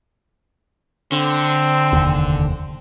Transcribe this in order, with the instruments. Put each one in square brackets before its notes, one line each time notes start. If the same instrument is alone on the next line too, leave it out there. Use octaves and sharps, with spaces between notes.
[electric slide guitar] D3 [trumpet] C4
[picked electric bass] F1 D#2